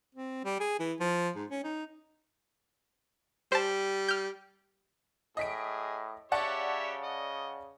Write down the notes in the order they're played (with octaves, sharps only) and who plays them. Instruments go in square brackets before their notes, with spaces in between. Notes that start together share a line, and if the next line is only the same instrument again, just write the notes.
[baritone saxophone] C4
G3
G#4
E3
F3
G#2
C#4
D#4
[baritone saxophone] G3 [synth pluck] C5 A5
[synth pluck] F6 G6
[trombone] A2 [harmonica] G#4 [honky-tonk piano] D#5 B6 D7
[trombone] C#3 [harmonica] G4 C#5 E5 [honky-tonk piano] D5 F#5 A5
[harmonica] D#5